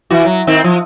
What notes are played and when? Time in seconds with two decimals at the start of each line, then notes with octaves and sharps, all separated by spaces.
0.11 E3 F#4
0.25 F#3
0.47 D#3 C4
0.64 F3